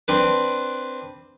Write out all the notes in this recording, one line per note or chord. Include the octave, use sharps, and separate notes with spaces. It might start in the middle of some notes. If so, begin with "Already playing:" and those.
C4 D4 B4